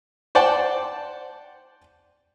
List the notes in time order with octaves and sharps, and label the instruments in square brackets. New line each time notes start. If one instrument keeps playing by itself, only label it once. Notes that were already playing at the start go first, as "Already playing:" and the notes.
[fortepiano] C5 D5 F#5 G5 A5